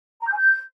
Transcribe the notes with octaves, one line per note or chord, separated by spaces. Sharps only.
A#5
G6
G#5
G6